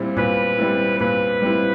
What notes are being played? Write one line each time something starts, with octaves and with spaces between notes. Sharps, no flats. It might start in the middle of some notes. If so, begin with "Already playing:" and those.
Already playing: A#2 G3 C4 E4
A#2 B4
G3 C4 E4
A#2 B4
G3 C4 E4